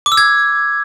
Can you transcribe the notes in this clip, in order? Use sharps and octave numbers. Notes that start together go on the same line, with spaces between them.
D6
E6
G#6